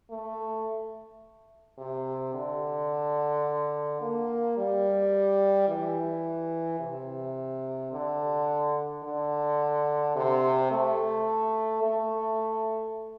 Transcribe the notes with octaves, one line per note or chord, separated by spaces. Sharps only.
A3
C3
D3
A#3
G3
E3
C3
D3
D3
C3
A3
A3